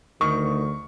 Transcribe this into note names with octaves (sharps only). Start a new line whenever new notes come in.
D2 D#3 C#6